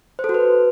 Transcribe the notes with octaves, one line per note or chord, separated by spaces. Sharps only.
C5
A4
F#4
B4